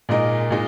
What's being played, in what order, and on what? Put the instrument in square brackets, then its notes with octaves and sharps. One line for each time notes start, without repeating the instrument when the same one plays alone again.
[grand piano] A#2 G#3 D#4 A#4 D#5
A#2 G#3 D#4